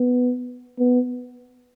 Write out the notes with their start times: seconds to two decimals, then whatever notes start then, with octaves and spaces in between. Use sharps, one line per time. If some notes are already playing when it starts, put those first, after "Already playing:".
Already playing: B3
0.79 B3